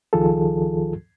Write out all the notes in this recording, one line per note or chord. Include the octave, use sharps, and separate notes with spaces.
C#2 D#3 F3 F4 G#4 A4